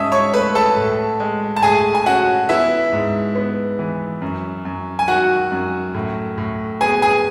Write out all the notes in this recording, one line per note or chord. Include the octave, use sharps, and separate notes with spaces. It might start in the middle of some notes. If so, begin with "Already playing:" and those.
Already playing: G#2 C#4 D#5 E5 A5 D#6 E6
C#5 C#6
A3 B4 B5
A4 A5
A2
G#3
A5
A2 G#4 G#5
G#5
C#4 F#4 F#5
B3 E4 E5
G#2
B3
E3
F#2
F#2
G#5
D#3 F#4 F#5
F#2
A2
A2
B3 G#4 G#5
G#4 G#5